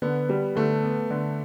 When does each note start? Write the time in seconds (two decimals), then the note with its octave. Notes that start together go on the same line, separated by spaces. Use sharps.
0.02 D3 B3
0.29 G3 B3
0.56 D3 A3
0.83 B3
1.11 D3